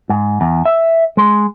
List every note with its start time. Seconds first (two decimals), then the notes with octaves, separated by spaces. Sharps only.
0.09 G#2
0.41 E2
0.65 E5
1.17 G#3